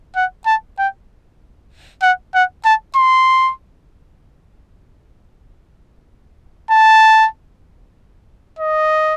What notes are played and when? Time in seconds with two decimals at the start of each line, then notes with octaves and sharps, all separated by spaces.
0.16 F#5
0.46 A5
0.78 G5
2.02 F#5
2.34 F#5
2.65 A5
2.96 C6
6.71 A5
8.59 D#5